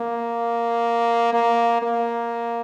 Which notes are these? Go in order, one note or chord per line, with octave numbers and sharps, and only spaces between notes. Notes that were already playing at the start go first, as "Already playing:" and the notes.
Already playing: A#3
A#3
A#3